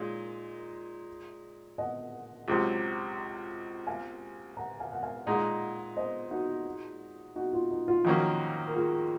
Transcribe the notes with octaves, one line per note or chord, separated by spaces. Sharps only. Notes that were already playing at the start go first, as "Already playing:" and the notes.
Already playing: A#2 G#3 D#4 C#5
D#5 F#5
C#2 C3 F#3
F5 G#5
F#5 A#5
F5 G#5
F#5
F5 G#5
A#2 G#3 D#4 D#5 F#5
C5 D#5
D#4 F#4
D#4 F#4
F4
D#4
F4
F2 D#3 F#3 A#3 C#4 D#4 F#4
A#4
F4 G#4